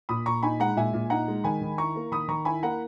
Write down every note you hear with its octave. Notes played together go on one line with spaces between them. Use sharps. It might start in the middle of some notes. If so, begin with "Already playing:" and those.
A#2 B5 D#6
A#2 A#5 C#6
D#4 G#5 B5
G#3 F#5 A#5
A#2 E5 G#5
A#2
D#4 F#5 A#5
G#3
D#3 G#5 B5
D#3
E4 A#5 C#6
A#3
D#3 B5 D#6
D#3 A#5 C#6
E4 G#5 B5
A#3 F#5 A#5